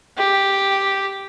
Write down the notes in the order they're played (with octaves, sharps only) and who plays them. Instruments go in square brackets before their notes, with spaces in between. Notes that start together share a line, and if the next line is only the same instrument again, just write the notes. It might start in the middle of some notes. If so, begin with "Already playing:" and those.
[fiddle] G4